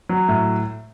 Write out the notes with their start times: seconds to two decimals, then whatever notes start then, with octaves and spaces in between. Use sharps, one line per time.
0.09 F#3
0.28 A2